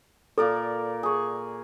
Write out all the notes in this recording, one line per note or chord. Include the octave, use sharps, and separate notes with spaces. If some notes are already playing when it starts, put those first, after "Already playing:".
A#2 A4 A#4 D5
G#4 C#6